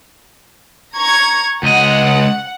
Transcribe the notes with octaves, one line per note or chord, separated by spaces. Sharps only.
A#5 C#6 G#6
C#2 D#5 F#5